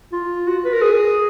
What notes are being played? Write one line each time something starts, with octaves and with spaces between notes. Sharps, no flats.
F4
F#4
B4
A#4
G#4